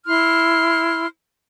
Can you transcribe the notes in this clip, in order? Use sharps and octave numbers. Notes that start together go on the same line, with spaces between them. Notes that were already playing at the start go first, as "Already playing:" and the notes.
E4 C6 F6